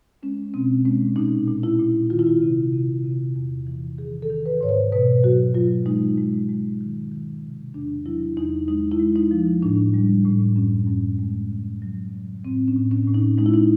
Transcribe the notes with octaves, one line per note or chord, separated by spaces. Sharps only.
G#3 C#4
B2 C4
G#3 C#4
A#2 D#4
A#2
E4
A#2
D#3 F4
E4
F4
C3
C3
C3
E2
E3
D#3 G#4
A4
D#3
B4
G#2 C#5
C5
B2 B4
F#3 F#4
F#3 F4
G#3 D#4
G#3
G#3
D#3
D#3
C3
E2 D4
F#3 E4
E2 D#4
G#3 D#4
E4
G#3
D#4
F3
A2 D4
G3
A2
F#2 C#4
F#2
G#3
C#3
F#3
C#3
A2 C4
C#4
A2
C#4
A2
D#4
G#3 D#4
E4
D#4